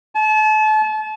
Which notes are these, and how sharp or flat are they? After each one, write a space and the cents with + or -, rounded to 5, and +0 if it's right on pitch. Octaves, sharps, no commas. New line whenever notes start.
A5 -35